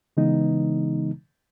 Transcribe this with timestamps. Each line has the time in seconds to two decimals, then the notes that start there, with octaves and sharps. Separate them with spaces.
0.17 C#3 E3 G#3 B3 D#4